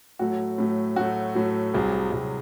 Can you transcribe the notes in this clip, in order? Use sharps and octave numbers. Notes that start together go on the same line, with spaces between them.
A2 F#3 A3 F#4
A2 F#3 A3
A2 F#3 A3 F#4
A2 F#3 A3
C2 C3 F#3 G#4
C2 C3 F#3